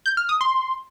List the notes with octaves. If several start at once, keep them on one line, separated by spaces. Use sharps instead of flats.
G6
F6
D#6
C6